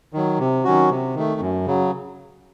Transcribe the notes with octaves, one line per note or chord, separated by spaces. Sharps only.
D#3 F#3
C3
D#3 F#3 C#4 F#4
C3
D#3 A3
F#2
C#3 F#3